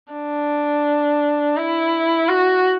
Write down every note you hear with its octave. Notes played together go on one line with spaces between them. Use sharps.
D4
E4
F#4